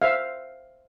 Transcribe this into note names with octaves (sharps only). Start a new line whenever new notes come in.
C5 E5 F5